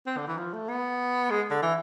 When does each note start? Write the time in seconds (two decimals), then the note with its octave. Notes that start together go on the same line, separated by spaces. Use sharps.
0.07 C4
0.17 D3
0.28 E3
0.37 F3
0.54 A3
0.69 B3
1.30 G#3
1.51 D3
1.62 E3